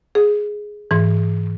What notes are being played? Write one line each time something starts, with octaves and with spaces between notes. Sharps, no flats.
G#4
G#2 E3